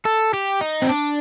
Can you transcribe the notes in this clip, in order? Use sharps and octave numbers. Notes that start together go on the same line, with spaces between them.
A4
G4
D#4
C4
D4